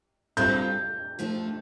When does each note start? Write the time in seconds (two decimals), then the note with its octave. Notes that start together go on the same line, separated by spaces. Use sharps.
0.37 G3 C4 F4 A4 G6
1.19 F3 A3 D4 A4